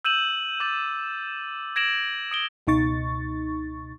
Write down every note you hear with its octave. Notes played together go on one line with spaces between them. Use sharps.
E6 G6 D#7 E7 F#7
D6 G6 A6 E7
G#6 A#6 D7 E7 F#7
D#6 D7 G7
C#2 B2 D#4 C#6 A6